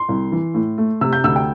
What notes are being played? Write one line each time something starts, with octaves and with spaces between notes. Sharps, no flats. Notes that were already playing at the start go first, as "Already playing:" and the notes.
Already playing: C6
C2
E3
A2
A3
C3 E6
G6
D2 E6
G5